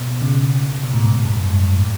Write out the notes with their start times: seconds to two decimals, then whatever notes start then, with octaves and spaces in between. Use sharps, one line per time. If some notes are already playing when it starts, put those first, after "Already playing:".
Already playing: B2
0.22 C#3
0.83 B2
0.94 A2
1.04 G#2
1.25 G2
1.35 F#2
1.45 G#2
1.76 A2